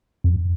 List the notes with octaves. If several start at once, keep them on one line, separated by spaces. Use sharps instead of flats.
F2